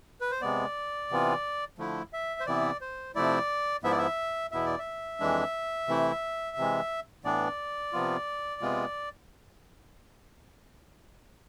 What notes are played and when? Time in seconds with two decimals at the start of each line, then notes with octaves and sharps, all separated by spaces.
0.21 B4
0.31 C5
0.41 C3 G#3 B3 D5
1.10 C3 E3 B3 F4
1.78 D3 F3 A3 E4
2.13 E5
2.40 C5
2.46 C3 E3 B3 E4 D5
2.81 C5
3.15 C3 F3 A3 E4 D5
3.83 G#2 F3 B3 E4 E5
3.91 D5
3.98 E5
4.52 E2 B2 B3 E4 E5
4.66 D5
4.79 E5
5.20 F2 E3 G#3 D4
5.88 C3 E3 A3 E4
6.57 C3 E3 G#3
7.24 A2 E3 B3 D4 D5
7.93 C3 F3 B3 F4
8.61 C3 G#3 B3 F4